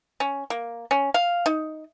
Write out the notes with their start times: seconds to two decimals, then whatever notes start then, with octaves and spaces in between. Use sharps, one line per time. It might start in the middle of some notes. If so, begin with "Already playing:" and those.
0.20 C#4
0.50 A#3
0.91 C#4
1.14 F5
1.46 D#4